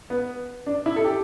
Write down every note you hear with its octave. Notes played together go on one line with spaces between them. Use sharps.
B3
D4
E4
A4
G4